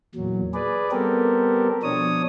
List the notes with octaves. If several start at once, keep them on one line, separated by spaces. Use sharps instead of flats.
E2 A#2 F#3
G#4 B4 D5
G3 B3 C4 G4 A4 A#4
B2 F3 D4 C#5 D#6